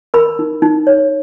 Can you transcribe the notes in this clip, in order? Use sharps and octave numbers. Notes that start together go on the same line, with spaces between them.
A#4 B5
D#4
D#4
C#5